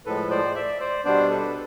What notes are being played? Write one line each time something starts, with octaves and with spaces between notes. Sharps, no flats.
A2 F3 G#3 A4 B4
C5 D5
D5 E5
C5 D5
B2 G3 B3 D4 C5 D5
A4 B4